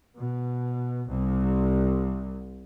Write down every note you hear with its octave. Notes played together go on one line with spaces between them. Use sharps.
B2
C2